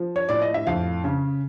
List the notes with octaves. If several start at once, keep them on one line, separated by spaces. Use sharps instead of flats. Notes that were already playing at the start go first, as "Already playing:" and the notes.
Already playing: F3
C#5
A2 D5
D#5
E5
F2 F5
C#3